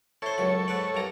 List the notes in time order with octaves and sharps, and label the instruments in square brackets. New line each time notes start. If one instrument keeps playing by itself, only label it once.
[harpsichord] E4 C5 [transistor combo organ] A4 C#5
[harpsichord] C#2 F#2 B5
G#2 B4 D5
C2 G2 A#5